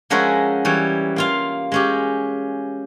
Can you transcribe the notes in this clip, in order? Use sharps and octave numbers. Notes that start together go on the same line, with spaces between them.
F3 G#3 C#4 F#4 A#4 E5
E3 G3 C#5
A#3 F4 F5
G#3 C#4 G4